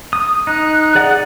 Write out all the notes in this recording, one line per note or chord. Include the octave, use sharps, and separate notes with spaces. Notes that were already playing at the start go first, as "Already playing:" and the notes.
D#6
D#4 F#6
G#4 D5 F#5